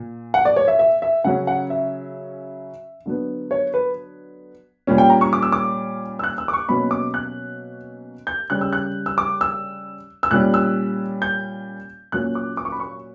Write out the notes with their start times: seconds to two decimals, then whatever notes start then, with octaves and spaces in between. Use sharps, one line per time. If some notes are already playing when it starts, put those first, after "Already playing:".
Already playing: A#2
0.34 F#5
0.45 D5
0.56 C#5
0.68 E5
0.79 E5
1.02 E5
1.24 C#3 F#3 C#4 F#5
1.47 F#5
1.70 E5
3.06 D3 F#3 B3
3.51 C#5
3.74 B4
4.87 A#2 G3 C#4
4.98 G5
5.10 A#5
5.21 C#6
5.33 D6
5.42 E6
5.52 D6
6.19 E6
6.24 F#6
6.38 E6
6.48 D6
6.53 C#6
6.69 B2 F#3 A#3 C#4 B5
6.91 D6
7.14 F#6
8.27 G6
8.50 C#3 G3 C#4 F#6
8.61 E6
8.73 F#6
9.06 E6
9.18 D6
9.41 E6
10.23 E6
10.31 A#2 G3 C#4 F#6
10.54 E6
11.22 G6
12.12 A#2 F#3 A#3 C#4 F#6
12.35 D6
12.57 D6
12.65 C#6
12.72 B5
12.80 C#6